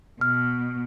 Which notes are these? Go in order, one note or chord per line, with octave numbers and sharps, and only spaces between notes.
B2 F6